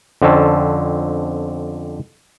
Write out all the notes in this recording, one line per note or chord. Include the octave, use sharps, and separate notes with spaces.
F2 D3 C4 C#4 A5